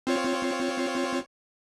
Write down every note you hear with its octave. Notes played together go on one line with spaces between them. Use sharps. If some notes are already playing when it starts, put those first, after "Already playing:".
C4 F4 C#5